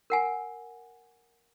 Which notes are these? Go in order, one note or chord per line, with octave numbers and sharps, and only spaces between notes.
A#4 F#5 G#5